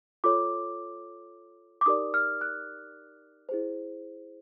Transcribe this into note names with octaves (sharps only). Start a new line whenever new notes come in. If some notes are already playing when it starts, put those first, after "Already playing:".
F4 A4 C#5 D6
D6
D#4 G4 A#4 D5 D#6
F6
F#6
E4 G#4 C5